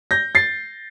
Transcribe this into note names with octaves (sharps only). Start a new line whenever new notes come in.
G6 A#6
A6 C7